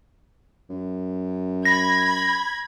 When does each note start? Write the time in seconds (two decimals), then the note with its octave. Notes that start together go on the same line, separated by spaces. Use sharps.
0.70 F#2
1.65 B5 G#6 A#6